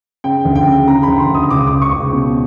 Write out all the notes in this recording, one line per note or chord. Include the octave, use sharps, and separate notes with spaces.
C#3 G5
D2
G5
C#3
C#3 A#5
D2 B5
C6
D2
D#6
C#2 D6
D#6
C#2 D6
C#6
C#2
B2